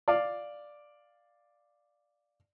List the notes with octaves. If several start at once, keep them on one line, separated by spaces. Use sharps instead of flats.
D5 F5